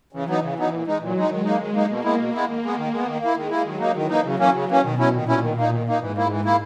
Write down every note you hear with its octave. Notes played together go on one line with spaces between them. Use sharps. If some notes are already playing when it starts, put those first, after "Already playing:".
C#3 E3
F#3 B3 D#4
C#3
F#3 B3 D#4
A#2
G#3 D#4
A#2 F#3
G#3 D#4
D#3 G#3
A#3 D#4
D#3 G#3
A#3 D#4
B2 A#3
G#3 B3 E4
B2
G#3 B3 E4
D#3 A#3
G#3 B3
D#3
G#3 B3
D#3
A#3 E4
D#3 G#3
A#3 E4
D#3 F#3
A#3 D#4
D#3 E3
A#3 D#4
C#3 F#3
E3 A#3 C#4
C#3
E3 A#3 C#4
B2 D#3
F#3 C#4 E4
A#2 D#3
F#3 C#4 E4
D#3
A#3 D#4
D#3
A#3 D#4
G#2 E3
A#3 E4
E3
A#3 E4